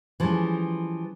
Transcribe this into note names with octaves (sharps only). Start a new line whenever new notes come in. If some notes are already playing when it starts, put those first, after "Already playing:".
E3 F3 G3 G#3 C#4